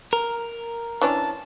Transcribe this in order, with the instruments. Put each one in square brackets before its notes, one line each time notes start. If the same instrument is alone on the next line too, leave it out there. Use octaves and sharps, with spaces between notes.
[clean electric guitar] A#4
[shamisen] E3 C#4 D4 [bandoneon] A5